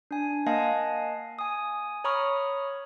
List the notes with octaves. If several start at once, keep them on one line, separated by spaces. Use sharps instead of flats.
D4 G#5
A#3 D#5 F5 F#5 G#5 A5
G#5 D#6
C#5 A#5 B5 C#6 D#6 F6